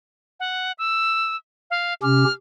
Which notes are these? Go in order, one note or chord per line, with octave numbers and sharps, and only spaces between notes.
F#5
E6
F5
C3 C#4 G4 F6